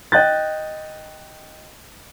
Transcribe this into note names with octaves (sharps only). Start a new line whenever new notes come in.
D#5 G5 F#6 G6 A6